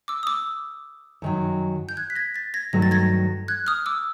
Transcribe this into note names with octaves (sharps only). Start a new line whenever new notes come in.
D6 E6
D#6
D6 E6
F#2 D#3 F#3
G6
F#6 G#6
B6
G#6 A#6
A6 B6
G#6 A#6
G2 D#3 F#3 A3 A#6
A6
G#6 A#6
F#6 G#6
D#6 F6
D6 E6